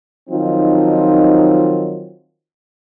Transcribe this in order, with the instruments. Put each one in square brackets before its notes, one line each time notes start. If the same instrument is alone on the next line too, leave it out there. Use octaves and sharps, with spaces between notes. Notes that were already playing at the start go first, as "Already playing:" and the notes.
[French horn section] D#3 F3 F#3 C4 D#4 F4